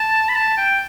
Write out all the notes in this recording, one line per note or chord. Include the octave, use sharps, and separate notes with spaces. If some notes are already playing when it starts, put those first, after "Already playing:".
Already playing: A5
B5
A5
G5